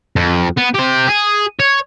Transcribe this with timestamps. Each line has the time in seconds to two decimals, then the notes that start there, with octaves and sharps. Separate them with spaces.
0.16 F2
0.58 B3
0.75 G4 C5
1.09 G#4
1.60 C#5